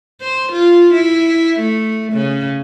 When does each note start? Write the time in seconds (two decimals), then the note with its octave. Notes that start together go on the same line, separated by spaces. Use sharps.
0.21 C5
0.52 F4
0.94 E4
1.60 A3
2.13 C#3